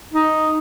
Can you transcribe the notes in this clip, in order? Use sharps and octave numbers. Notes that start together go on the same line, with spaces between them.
D#4